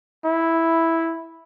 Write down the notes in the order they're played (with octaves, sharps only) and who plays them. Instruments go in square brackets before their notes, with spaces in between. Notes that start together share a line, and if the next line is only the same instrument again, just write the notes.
[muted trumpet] E4